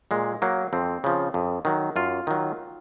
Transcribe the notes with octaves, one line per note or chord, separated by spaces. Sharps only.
A#2 G#3
F#3 A#3
F2 C4
C#3 F3
F2
D#3 F#3
F#2 F4
D#3 F#3